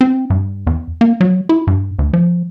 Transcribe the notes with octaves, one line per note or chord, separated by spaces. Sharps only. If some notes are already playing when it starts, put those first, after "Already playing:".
C4
G2
E2
A#3
F#3
E4
G2
D2
F3